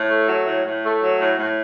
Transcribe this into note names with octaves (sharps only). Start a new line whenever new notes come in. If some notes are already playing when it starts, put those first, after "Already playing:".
Already playing: A2
A3
F#3
A2
A2
A3
F#3
A2
A2